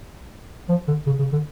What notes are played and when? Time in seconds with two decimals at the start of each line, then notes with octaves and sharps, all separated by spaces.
0.69 F3
0.88 D3
1.06 C#3
1.19 C#3
1.32 D3